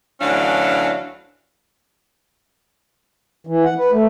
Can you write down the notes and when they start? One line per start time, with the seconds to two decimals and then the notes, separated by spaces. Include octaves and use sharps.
0.20 D2 E3 F#3 C#4 D4 F5
3.47 E3
3.65 F#5
3.78 B4
3.91 A3